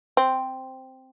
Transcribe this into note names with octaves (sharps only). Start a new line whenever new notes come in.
C4